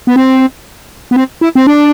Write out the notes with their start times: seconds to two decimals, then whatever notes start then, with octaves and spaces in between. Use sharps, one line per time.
0.07 B3
0.16 C4
1.11 B3
1.16 C4
1.41 E4
1.55 C4
1.67 D4